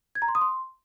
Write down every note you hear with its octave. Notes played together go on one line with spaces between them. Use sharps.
G#6
A#5
C6
D#6
C6